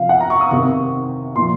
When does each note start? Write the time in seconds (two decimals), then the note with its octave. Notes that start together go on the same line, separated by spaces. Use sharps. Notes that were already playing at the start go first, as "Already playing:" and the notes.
Already playing: C3 F3 F5
0.09 F#5
0.20 A#5
0.30 C#6
0.41 D#6
0.51 C3 D#3 C#6
1.36 A#2 F3 C6